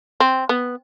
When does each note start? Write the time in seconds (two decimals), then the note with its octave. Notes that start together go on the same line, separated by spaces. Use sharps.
0.20 C4
0.49 B3